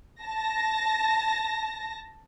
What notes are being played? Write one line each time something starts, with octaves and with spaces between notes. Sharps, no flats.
A5 A#6